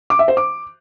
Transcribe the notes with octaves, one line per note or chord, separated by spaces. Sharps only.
D6
E5
C5
D6